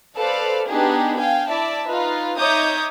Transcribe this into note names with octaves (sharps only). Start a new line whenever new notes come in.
A4 B4 C5 D5 F5
B3 D4 D#4 G4 G#4
F5 G5 G#5
E4 D5 E5 A5
D#4 F4 B4
D#4 C#5 E5 D6 D#6 G6